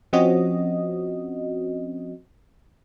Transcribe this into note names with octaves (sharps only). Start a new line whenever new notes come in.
F3 C4 C#4 F#4 D#5